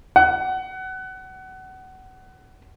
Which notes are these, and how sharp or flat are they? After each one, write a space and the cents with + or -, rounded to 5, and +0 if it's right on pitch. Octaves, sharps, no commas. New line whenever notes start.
F#5 +25